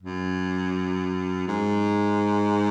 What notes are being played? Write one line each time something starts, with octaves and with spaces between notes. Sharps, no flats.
F#2
G#2